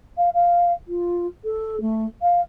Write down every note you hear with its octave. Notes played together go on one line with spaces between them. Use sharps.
F5
F5
F4
A4
A3
F5